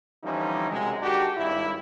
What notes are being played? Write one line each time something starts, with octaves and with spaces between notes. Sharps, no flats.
D3 E3 F3 G3 C#4 D#4
B1 F#2 C3 G#3
D#3 G#3 D4 F#4 G4
G#1 G2 E4